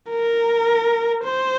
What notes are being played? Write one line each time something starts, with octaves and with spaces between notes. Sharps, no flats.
A#4
C5